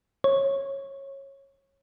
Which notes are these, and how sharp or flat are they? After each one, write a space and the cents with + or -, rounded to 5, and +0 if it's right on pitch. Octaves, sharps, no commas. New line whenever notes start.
C#5 -20